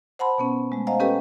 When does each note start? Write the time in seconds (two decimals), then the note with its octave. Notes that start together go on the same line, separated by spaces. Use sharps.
0.19 C5 F#5 A5 B5 C6
0.38 B2 B3 C#4
0.72 G#3 A3
0.87 C5 D#5 F5 F#5 G#5 A#5
1.00 C#4 G4 A4 B4 D#5 G5